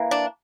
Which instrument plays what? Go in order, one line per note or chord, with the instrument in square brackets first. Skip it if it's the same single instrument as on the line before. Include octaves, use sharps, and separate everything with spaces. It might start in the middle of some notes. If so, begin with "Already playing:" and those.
Already playing: [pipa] E3 A#3
D4